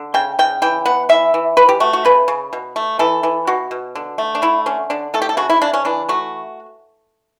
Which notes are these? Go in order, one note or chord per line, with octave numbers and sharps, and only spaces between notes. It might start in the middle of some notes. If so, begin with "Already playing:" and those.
Already playing: D3
C#3 G5
C#3 G5
E3 G5
B3 F#5
E3 E5
E3
E3 B4
G4
A3 F#4
F#4
C#3 B4
C#3
B2
A3
E3 A4
E3
B2 F#4
B2
D3
A3
D4
D3 E4
D3 C#4
D3 D4
A3 A4
G4
A4
C#3 F#4
E4
C#3 D4
C#4
E3 D4
A3 F#4